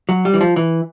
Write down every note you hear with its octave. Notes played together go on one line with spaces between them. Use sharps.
F#3
G3
E3
F3
E3